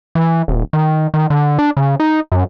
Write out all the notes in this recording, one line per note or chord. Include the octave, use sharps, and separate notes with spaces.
E3
D#1
D#3
D#3
D3
D4
C#3
D#4
F#2